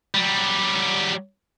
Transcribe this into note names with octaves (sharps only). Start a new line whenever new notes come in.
F#3 G3